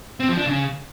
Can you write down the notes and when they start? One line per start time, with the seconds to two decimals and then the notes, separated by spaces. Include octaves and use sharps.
0.20 C4
0.29 F3
0.37 D4
0.46 C#3